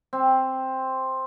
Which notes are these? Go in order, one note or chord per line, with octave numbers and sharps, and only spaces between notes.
C4